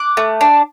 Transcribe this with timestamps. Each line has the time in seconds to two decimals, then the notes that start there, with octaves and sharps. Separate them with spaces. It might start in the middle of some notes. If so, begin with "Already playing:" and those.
Already playing: D6 F#6
0.17 A3
0.41 D4